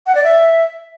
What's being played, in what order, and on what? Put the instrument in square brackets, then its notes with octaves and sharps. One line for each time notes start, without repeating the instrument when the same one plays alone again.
[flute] F#5
D5
E5